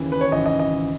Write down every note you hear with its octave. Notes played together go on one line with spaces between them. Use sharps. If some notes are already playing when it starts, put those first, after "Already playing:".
Already playing: D#2 C#3 E3
B4
C#5
G#1 F#2 C#3 E3 D#5
D#5
D#5